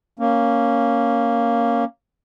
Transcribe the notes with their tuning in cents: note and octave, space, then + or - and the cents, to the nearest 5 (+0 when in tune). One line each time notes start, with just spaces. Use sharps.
A#3 +0 C#4 +0